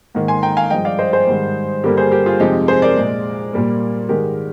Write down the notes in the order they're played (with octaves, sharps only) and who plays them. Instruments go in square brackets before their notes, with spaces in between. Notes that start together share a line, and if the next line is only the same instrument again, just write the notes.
[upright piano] G#2 D#3 A#3
G#5 C6
G5 A#5
F5 G#5
G2 F3 G#3 D#5 G5
D5 F5
C5 D#5
G#4 C5
G#2 D#3 G3
G2 D3 G3 A#3 G4 A#4
G#4 C5
G4 A#4
F4 G#4
F2 C3 F3 G#3 D#4 G4
G#4 C5
A#4 D5
A#2 G#3
A#2 G3 A#3
G#2 D#3 G#3 G4 A#4